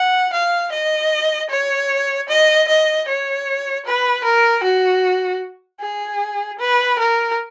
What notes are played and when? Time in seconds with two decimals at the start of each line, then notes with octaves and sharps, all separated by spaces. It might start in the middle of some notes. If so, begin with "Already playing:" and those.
Already playing: F#5
0.33 F5
0.72 D#5
1.50 C#5
2.29 D#5
2.68 D#5
3.08 C#5
3.86 B4
4.24 A#4
4.63 F#4
5.81 G#4
6.59 B4
6.99 A#4